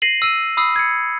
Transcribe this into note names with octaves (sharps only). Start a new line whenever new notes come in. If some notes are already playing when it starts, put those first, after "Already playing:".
A#6 C7 D#7 F#7
E6 D#7
B5 D#6 E6 C7
G#6 C#7